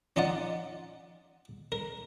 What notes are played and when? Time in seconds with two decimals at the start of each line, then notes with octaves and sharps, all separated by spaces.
0.16 C#4 D#4 F4 D5 F#5
1.72 A#4